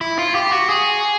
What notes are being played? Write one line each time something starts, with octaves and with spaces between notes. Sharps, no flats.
E4
F4
G4
F#4
G#4